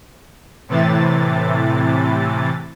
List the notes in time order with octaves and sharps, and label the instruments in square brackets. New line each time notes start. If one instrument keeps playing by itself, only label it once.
[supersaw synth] A2 C3 E3 A6